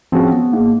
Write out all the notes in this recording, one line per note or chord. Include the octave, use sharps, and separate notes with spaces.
F3 G#3 C4 C#4 F#4
B3
G#2 A#3